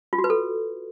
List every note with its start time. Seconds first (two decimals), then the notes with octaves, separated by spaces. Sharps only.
0.13 F4
0.18 F#4
0.24 B4
0.30 A4